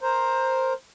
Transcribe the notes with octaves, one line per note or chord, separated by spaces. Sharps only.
A#4 C5